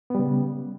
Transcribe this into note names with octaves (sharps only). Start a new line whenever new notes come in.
C#3 G3 B3